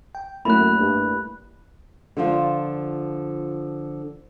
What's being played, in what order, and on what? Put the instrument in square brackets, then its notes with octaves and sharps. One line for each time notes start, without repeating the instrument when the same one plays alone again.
[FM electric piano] G5
[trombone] F#2 [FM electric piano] A3 A#3 E4 [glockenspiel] B5 F#6
[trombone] G2
[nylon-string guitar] D3 F3 F4